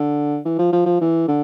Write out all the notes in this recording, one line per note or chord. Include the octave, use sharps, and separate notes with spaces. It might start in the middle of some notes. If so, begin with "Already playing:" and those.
Already playing: D3
E3
F3
F3
F3
E3
D3